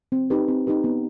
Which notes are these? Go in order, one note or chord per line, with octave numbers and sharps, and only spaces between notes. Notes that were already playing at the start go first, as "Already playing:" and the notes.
C4
D#4 G4 B4
C4
D#4 G4 B4
B3